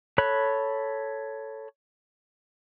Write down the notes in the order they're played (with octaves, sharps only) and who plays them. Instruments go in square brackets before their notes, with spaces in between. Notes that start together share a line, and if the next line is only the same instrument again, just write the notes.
[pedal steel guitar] A4 C#5 B5 F#6